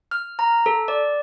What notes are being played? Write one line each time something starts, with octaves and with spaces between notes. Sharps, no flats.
F6
A#5
A4
D5